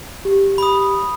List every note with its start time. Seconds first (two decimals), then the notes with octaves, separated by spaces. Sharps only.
0.25 G4
0.58 B5 D#6